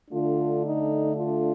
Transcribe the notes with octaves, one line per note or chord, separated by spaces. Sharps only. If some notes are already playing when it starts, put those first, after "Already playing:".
D3 A3 D4 F4
D#4
F4